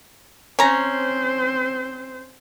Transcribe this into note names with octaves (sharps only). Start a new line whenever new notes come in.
C4 C#4 C5 A#5